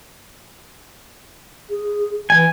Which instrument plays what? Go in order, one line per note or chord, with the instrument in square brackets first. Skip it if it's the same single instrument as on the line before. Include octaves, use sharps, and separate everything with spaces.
[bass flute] G#4
[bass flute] E3 [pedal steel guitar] G#5